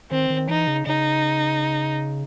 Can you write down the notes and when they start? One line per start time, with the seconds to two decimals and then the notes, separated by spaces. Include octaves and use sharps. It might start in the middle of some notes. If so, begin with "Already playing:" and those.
0.11 D#3 C4
0.30 D#3
0.49 E3 D#4
0.67 C#3
0.86 C#3 D#4